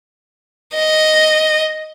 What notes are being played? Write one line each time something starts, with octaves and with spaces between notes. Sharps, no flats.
D#5